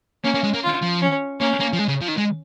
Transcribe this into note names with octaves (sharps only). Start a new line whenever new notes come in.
A#3 C#4
A#3
G#3
A#3
F4
F3
C#4
A#3 C#4
A#3
F3
G#3
C#3
F3
D#3
G#3